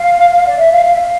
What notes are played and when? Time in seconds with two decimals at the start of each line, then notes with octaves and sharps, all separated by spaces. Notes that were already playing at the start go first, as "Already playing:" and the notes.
Already playing: F5
0.47 D5
0.57 E5
0.72 F5
0.85 F5
0.93 E5
1.00 F5